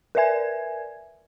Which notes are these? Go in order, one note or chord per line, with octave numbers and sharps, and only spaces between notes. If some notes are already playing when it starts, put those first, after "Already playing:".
A#4 B4 D5 E5 G#5 G#6